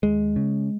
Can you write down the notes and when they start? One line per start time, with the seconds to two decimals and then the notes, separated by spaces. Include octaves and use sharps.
0.03 D#2 G#3
0.36 C#3